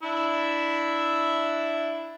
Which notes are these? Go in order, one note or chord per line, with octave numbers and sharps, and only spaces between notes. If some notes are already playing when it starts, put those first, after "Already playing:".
D4 E4 E5